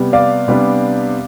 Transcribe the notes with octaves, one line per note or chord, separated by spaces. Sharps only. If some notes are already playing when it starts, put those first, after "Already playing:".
Already playing: C3 G3 B3
D5 F5
C3 G3 B3 D4